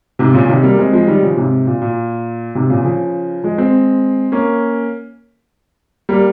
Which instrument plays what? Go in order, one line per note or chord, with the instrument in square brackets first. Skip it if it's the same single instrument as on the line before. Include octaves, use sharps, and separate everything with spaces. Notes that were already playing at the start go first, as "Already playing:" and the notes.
[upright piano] G#2 C3
A#2 C#3
C3 D#3
G3 A#3
G#3 C4
F3 G#3
D#3 G3
C#3 F3
G#2 C3
A#2
A#2
G#2 C3
A#2 C#3
C#3 F3
F3 G#3
G#3 C4
A#3 C#4
G3 A#3